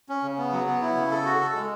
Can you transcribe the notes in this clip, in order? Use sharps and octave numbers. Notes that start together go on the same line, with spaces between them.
C#4
C#3
B3
F#3
B3
E4
C#3
A4
F#4
A4
G#3